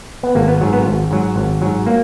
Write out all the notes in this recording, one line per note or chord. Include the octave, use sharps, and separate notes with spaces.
B3
G#1 A#3
B3
G#2 F#3
B3
G#1
G#2 F#3
G#1
G#2 F#3
A#3